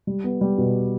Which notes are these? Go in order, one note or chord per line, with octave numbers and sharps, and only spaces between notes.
G3
B3
G3
B2